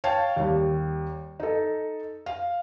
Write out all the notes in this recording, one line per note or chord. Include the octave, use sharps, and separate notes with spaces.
C#5 F5 G5 A5
D#2 G3
D#4 A4
F5